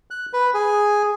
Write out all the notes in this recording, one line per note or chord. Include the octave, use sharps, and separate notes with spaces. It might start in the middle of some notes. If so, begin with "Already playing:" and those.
F#6
B4
G#4